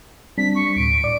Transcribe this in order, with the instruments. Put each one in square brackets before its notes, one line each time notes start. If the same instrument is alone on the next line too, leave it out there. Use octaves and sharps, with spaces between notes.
[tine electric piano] G3 C4 D4 [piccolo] B6
[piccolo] C#6
[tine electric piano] D2 A2 [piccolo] D7
[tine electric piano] D5 D6